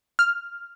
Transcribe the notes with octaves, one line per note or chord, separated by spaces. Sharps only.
F6